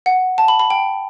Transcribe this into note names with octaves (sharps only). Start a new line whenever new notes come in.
F#5
A5
B5
B5
G5